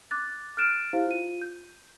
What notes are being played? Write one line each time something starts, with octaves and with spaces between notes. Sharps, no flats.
D6 F#6 A6
F6 F#6 A6 D7 E7
E4 G4 C5 F5
F4 D#7
G6